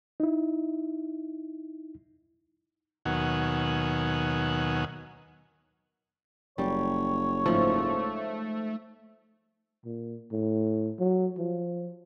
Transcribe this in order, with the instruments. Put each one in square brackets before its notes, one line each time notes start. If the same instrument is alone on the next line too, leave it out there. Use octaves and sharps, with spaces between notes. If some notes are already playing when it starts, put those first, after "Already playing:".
[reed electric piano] D#4 E4
[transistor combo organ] D#2 B2 D#3 F#3 F#5 G#5
[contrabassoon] F#1 [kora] G3 [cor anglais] C#5
[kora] G#2 F3 [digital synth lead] A3
[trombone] A#2
A2
F#3
F3